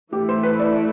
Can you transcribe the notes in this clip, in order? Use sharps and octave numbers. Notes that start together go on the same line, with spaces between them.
E3 A3 E4 G4
C5
B4
D5